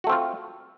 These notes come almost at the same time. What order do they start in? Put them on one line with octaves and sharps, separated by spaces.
F#4 A3 C4 F4